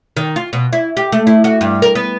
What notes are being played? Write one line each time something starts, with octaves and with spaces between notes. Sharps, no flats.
D#3
F4
B2
E4
G4
A3
E4
F#4
G2
A#4
B3